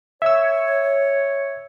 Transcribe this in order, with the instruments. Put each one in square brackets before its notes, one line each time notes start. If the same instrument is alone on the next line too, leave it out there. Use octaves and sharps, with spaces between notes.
[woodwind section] C#5 [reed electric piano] E5 E6